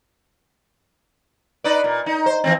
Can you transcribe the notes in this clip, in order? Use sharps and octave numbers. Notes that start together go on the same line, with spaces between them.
D#4 B4 D5
A#2
D#4
C5
E3 G3 C4